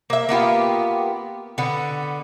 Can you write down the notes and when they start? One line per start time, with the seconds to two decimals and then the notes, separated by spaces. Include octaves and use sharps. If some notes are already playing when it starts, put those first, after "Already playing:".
0.10 A#3 E5
0.29 A#3 B3 F4 G4
1.58 D3 B3